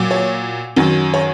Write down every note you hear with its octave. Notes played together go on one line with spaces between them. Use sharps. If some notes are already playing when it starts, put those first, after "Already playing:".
Already playing: A#2 F#3
C#5
F#2 D#3 F#3
C#5